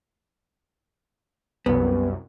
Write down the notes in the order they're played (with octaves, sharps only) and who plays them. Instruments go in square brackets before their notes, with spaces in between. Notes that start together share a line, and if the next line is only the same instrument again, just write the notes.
[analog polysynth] C2 F#2 [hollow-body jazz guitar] B3